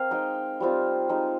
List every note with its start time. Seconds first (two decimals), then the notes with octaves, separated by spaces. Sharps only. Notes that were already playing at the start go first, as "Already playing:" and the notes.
Already playing: C4 A#4 F5
0.11 G#3 D#4 D#5 G5
0.60 G3 C4 F4
1.09 G#3 D#4